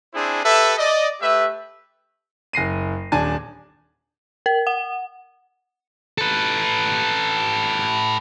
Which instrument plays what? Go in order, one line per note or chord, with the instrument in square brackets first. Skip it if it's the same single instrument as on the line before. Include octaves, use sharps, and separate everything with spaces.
[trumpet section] C4 D4 E4 G#4 C5
G4 A4 B4 E5
D5 D#5
A3 G4 B4 E5
[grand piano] F#1 A#6 C7 D#7
D#1 D4 G#5 A5
[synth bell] A#4
F#5
[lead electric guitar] A4 B4